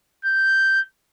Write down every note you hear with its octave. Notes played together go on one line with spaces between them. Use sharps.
G6